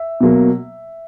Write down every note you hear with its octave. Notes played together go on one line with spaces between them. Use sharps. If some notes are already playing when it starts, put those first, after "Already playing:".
Already playing: E5
B2 F#3 A#3